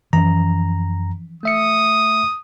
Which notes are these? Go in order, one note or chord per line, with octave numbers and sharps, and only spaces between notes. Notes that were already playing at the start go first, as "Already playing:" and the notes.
F#2 E3 F3 C#4 A#5
A3 E5 D#6 C#7